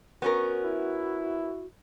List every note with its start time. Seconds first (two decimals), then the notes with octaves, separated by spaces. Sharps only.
0.22 B3 C#4 F#4 A#4
0.64 E4